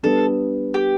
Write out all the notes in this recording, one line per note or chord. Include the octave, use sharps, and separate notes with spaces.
G3 B3 D4 A4
G4